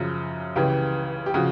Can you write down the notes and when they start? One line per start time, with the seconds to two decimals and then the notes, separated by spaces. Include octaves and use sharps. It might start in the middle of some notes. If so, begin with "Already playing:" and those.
Already playing: F#2 C#3 F3
0.56 C#2 C#3 E3 G4
1.26 G4
1.34 C#3 F3 F#4